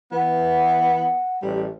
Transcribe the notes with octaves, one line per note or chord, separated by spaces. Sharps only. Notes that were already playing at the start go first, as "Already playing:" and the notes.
E3 B3 F#5
A1 G3